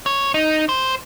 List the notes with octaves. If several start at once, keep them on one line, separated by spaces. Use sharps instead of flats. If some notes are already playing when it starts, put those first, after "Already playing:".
C#5
D#4
C5